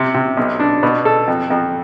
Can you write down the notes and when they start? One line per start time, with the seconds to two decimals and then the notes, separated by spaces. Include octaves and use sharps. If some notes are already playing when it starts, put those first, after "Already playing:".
Already playing: C3
0.14 C3
0.37 B1
0.59 D4
0.83 B2
1.05 A4
1.28 F2
1.50 F2